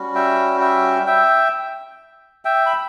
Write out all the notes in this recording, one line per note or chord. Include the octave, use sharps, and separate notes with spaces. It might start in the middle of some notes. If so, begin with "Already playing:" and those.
Already playing: G3 C#4 F#4
E5 G5
E5 G5
E5 G5
E5 G5
B5